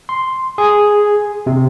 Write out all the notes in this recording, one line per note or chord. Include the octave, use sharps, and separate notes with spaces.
C6
G#4
C3